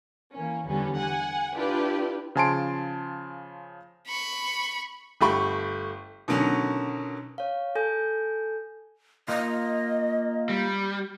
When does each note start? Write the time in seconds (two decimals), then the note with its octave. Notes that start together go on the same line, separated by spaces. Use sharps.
0.34 E3 A#3 C#4
0.66 E2 D3 G3 B3 C#4
0.97 F#5 G#5
1.56 D4 E4 F4 G4 B4
2.35 C#3 F3 G#5 A5 C6 D7
4.08 B5 C#6
5.21 G1 A3 G4 B5 C#6
6.28 B2 D3 D#3 F#3 C#4
7.38 C#5 F5
7.75 A4 G#5 G6
9.28 A#3 F4 D#5
10.49 G3